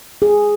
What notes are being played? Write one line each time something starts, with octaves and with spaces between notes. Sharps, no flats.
G#4